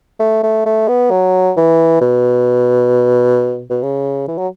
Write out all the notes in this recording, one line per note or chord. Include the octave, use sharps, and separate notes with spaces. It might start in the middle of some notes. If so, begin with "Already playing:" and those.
A3
A3
A3
B3
F#3
E3
B2
B2
C#3
E3
F#3